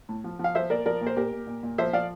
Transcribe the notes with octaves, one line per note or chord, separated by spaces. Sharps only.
A2
F3
F3
F5
F3 C5 E5
A#2 A#4 D5
F3 A#4 D5
A#2
C5
A#2 G4 A#4
A#2
A#2
A#2
F3 C5 E5
F3 D5 F5